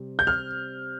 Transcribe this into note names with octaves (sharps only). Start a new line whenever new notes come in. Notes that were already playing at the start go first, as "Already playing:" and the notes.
Already playing: C3 G3 C4
G6
F6